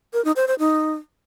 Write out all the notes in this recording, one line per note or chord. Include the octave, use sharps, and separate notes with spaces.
A#4
D#4
C5
C5
D#4